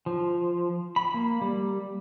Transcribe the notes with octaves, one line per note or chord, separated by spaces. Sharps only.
F3
B5
A#3
G3